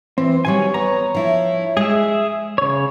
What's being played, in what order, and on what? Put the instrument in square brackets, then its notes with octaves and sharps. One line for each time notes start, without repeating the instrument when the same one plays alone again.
[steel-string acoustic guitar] E3 [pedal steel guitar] C4
[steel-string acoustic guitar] D#3 F#3 G3 [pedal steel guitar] C#5 G#5
[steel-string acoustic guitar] B3 [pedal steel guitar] C#5 A#5
[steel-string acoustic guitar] F3 E4
[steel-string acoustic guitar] G#3 [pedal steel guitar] G#4 E5
[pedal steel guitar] C#3 C#5